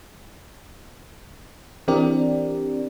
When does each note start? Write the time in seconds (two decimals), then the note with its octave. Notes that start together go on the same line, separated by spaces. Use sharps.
1.88 E3 C4 D4 G4 A#4 D5